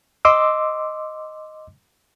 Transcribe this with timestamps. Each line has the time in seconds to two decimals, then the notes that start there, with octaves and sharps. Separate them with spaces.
0.25 D#5 C6 D6 E6